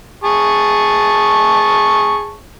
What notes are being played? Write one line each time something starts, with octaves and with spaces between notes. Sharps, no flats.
G#4 A5 C#6